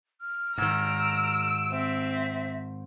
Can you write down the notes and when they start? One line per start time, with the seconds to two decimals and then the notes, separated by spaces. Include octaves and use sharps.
0.21 F6
0.58 G#2 D#3 A#5 E6 D7
1.72 C4 E5